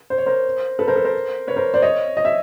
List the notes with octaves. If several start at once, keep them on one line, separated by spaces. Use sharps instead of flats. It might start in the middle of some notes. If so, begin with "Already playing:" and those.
C5
C#5
A#4 C5
A4 B4
A#4 C5
A4 B4
A#4 C5
B4 C#5
A#4 C5
C5 D5
C#5 D#5
D#5
E5